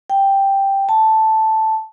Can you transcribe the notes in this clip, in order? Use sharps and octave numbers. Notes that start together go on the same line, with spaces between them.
G5
A5